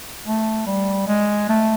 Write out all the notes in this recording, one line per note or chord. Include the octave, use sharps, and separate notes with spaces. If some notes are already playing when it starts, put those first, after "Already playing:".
A3
G3
G#3
A3